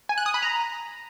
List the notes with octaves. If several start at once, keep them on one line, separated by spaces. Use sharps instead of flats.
G#5
F#6
D#6
B5
A#5